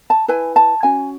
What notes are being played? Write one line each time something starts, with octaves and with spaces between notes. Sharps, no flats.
A5
E4 B4 G#5
A5
C#4 F#4 G#5